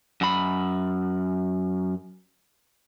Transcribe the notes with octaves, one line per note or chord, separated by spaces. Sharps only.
F#2 B5